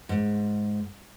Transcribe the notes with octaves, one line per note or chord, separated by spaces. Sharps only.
G#2